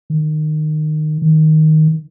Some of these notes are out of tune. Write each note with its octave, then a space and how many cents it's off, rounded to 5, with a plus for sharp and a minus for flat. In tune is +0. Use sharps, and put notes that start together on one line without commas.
D#3 -20
D#3 +5